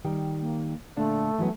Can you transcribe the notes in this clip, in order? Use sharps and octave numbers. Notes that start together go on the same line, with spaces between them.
D#3 G3 G5
A#3
A#2 D3 A3 D4
E3 F#3 B3